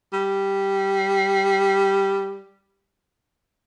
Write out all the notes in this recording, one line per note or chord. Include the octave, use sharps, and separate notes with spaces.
G3